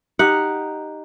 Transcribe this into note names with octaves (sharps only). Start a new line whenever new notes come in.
D#4 G4 F#5